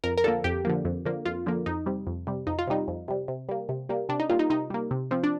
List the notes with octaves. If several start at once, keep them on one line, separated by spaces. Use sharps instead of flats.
F2 A#4
A#4
D3 F3 A#3 A4
F2 G4
D3 F3 A#3
F2
D3 F3 A#3
F2 F4
D3 F3 A#3
F2 D#4
C3 G3
F2
C3 G3
F2 D#4
F4
C3 G3 D#4
F2
C3 G3
C3
G3 A#3
C3
G3 A#3
C3 D4
D#4
G3 A#3 F4
D#4
C3 D#4
G3 A#3
C3
F3 C4
D4